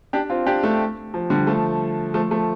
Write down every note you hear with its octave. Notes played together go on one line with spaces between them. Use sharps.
D4 G4
C4 F4
D4 G4
A3 D4
F3
D3 G3
F3 A3
F3 A3
F3 A3